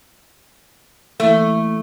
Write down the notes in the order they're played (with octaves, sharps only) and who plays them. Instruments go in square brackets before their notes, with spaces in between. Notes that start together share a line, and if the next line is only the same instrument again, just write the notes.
[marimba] E3 A#3 E4 [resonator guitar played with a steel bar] A3